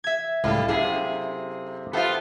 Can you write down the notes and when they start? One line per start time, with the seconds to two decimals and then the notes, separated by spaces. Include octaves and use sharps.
0.04 E5 G#6
0.44 C#2 A2 G3 F4 A4 E5
0.68 F#2 C3 E4 G4 G#4 F#5
1.93 B3 F4 G4 A4 C5 E5